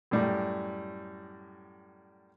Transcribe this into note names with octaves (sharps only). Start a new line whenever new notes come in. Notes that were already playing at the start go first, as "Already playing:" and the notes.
F#2 A2 G3